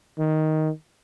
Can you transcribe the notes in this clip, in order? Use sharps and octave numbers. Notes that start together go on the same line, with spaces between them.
D#3